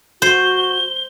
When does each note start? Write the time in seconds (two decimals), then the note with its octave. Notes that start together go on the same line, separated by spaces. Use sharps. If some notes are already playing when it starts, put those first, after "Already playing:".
0.22 F#4 C5 G7